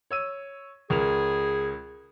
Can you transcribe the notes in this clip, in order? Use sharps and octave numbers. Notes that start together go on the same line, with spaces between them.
C#5 E6 D#7
C#2 G#4 A#4 F7